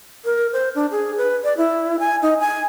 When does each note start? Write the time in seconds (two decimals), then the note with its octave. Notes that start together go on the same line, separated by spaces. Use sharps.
0.25 A#4
0.53 C5
0.75 D4
0.91 G#4
1.17 B4
1.44 D5
1.57 E4
2.00 G#5
2.22 D#4
2.40 G#5